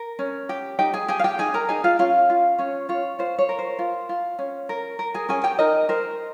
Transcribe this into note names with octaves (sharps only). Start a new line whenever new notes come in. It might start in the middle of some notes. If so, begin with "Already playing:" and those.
Already playing: A#4
C#4
G4
D#4 G4 G5
G#4 G#5
G4 G#4 G#5
F5
G4 G5
D#4 G#4 G#5
A#4 A#5
D#4 G#4 G#5
F4 F5
C#4 F4 F5
F4
C#4 C#5
F4 C#5
F4 C5
C#5
A#4
C5
F4
F4
C#4
A#4
A#4
G#4 G#5
C#4 G#4 G#5
G4 G5
D#4 A#4 D#5
A#4 C5